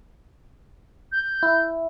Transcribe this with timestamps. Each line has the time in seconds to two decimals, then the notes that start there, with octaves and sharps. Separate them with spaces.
1.12 G6
1.43 E4